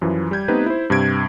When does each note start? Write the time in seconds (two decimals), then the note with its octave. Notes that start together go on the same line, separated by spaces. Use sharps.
0.02 F#2 E3 F3
0.31 G3 G4 G6 G#6
0.48 A3 B3 C4 D#4 G4 B4
0.66 E4 C5
0.90 G2 C3 G#6 D7